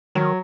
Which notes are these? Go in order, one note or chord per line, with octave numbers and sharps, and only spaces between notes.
D#3 F#3